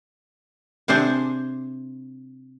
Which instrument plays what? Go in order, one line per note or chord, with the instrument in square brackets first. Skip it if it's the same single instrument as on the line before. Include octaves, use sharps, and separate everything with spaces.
[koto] C3 C4 D4 G#4 C5